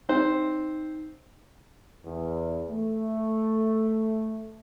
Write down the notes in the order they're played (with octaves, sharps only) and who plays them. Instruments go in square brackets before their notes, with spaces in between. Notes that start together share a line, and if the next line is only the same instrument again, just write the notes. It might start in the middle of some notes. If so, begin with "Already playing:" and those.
[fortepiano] C4 C5 [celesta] D#4
[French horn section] E2
A3